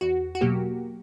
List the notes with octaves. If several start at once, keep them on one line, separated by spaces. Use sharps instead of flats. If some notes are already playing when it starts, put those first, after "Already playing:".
E2 F#4
F#4
B2 F#3 A#3 G4